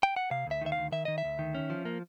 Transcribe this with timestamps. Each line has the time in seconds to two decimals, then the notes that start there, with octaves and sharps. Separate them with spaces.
0.03 G5
0.16 F#5
0.31 C3 F5
0.47 D2 E5
0.61 D#3 E5
0.72 F5
0.78 D2
0.92 D#3 E5
1.05 D#3 D#5
1.18 E5
1.24 D2
1.39 D#3
1.55 C#4
1.70 F3
1.85 A#3